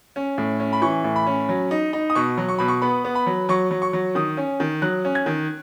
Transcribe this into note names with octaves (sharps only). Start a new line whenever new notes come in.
C#4
A2
C#4
B5
E3 C#6
A2
B5
C#4
F#3
D#4
D#4
D#6
B2 C#6
F#3
C#6
B2 B5
C#6
B3 B5
B3
B5
F#3
F#3 C#6
F#3
C#6
F#3
D#3 D#6
C#4
D#3
F#3 F#6
C#4
G#6
D#3